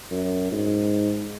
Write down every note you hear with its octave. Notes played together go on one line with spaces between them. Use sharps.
F#2
G#2